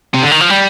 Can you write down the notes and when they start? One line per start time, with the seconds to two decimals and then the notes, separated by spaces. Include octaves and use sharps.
0.14 C3
0.22 D3
0.31 D#3
0.41 F3
0.50 G3